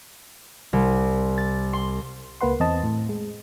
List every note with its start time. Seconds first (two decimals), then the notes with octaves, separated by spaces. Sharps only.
0.73 C2
1.38 A6
1.73 C6
2.41 C#2 A#3 B4 F#5 C6
2.60 E2 C4 D#5 A5
2.83 A2
3.09 G#3